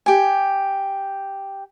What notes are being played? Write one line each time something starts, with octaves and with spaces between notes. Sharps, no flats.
G4 G#5